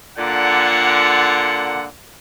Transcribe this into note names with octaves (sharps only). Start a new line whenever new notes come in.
A#2 D3 F#5